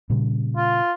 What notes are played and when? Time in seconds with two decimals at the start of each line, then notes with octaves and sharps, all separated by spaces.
0.10 A#2 C#3 G3
0.56 F4